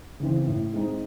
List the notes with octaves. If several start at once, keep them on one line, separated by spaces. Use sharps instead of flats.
C#3 E3 C4
A2
G#3 C4 D#4